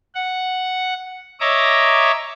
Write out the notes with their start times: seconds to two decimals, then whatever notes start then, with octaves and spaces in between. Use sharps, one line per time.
0.15 F#5
1.40 C#5 D#5 E5 A#5 D6